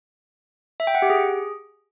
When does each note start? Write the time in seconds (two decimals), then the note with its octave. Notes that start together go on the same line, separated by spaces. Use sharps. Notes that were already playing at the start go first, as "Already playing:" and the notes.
0.80 E5
0.87 G5
0.95 F#5
1.02 G4
1.10 G#4